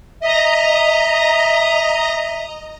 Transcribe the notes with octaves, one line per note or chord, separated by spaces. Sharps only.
D#5 E5 A#5